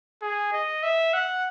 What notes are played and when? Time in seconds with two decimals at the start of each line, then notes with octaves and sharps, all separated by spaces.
0.22 G#4
0.53 D#5
0.83 E5
1.13 F#5